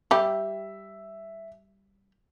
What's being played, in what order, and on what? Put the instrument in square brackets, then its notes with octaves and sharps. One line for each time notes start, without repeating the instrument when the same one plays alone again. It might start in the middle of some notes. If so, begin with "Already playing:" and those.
[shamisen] G3 G4 [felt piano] E5